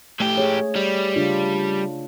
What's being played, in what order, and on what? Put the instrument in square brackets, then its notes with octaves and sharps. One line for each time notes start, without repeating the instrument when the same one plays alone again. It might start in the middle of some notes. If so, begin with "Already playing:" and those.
[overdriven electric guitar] A2 G4 [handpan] A3
[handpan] G#4 C#5
[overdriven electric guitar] G3
[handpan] C#3 D4 F4